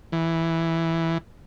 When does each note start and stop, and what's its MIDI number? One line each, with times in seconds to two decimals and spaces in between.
0.12 1.18 52